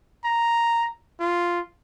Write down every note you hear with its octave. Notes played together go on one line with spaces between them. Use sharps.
A#5
F4